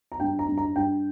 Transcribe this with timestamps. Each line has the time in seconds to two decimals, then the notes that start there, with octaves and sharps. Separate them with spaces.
0.12 A#5
0.20 G2 G5
0.39 A#5
0.48 G2
0.58 A#5
0.76 G2 G5